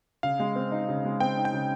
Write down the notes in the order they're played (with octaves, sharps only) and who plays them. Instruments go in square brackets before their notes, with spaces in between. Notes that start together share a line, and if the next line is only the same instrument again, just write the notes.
[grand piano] C#3 [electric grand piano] F5
[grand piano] G#3
C4
D#4
C#3
G#3
[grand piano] C4 [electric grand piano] G5
[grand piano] D#4
[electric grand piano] G5
[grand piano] C#3